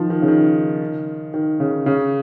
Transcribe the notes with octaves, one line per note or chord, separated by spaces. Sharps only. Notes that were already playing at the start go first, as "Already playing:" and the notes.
Already playing: D#3 F3
D#3
C#3
D#3
D#3
C#3
C#3